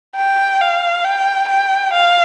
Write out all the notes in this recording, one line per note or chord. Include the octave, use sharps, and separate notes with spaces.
G5
F5
G5
G5
F5